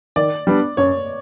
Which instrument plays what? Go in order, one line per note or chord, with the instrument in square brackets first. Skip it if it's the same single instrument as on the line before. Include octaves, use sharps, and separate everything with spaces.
[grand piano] D#3 [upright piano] D5
[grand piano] G3 B3 D4
[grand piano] F#2 [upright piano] C#5